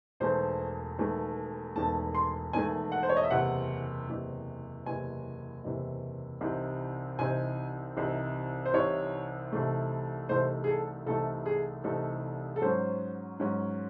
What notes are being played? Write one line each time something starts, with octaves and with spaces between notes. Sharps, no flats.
E1 E2 D#3 A3 C5
E1 E2 D#3 A3
E1 E2 D#3 A3 A5
C6
E1 E2 D#3 A3 G#5
F#5
C5
C#5
D#5
E5
F#1 E2 C3 E3 F#5
F#1 E2 C3 E3
F#1 E2 C3 E3 G#5
F#1 E2 C3 E3
C2 C3 E3 C4 D#4
C2 C3 E3 C4 D#4 G#5
C2 C3 E3 C4 D#4
C5
C2 C3 E3 C4 D#4 C#5
C2 C3 E3 A3 D#4
C2 C3 E3 A3 D#4 C5
G#4
A4
C2 C3 E3 A3 D#4 A4
G#4
C2 C3 E3 A3 D#4 A4
A4
G#2 F#3 C#4 C5
G#2 F#3 C#4